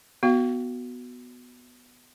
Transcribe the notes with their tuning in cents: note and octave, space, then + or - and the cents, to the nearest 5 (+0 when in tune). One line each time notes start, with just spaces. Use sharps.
B3 +0 F#4 +0 F5 +0